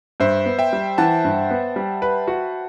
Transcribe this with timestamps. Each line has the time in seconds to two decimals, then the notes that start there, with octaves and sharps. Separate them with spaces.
0.20 G2 C5 E5
0.46 B3
0.59 E5 G5
0.73 G3
0.98 E3 F#5 A5
1.24 G2
1.51 B3
1.76 G3
2.02 B4
2.27 F#4